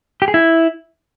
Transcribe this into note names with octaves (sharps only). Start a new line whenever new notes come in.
G4
G#4
E4